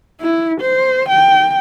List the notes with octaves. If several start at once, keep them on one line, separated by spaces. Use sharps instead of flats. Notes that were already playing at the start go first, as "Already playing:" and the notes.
E4
C5
G5